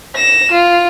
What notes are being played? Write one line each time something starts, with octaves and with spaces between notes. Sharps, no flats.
A#6 E7
F4